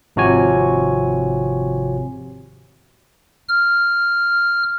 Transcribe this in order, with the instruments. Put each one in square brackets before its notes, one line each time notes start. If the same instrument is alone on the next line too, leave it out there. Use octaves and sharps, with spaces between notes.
[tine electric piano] G#1 C3 F3 F#4 C#5 G#5
[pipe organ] F6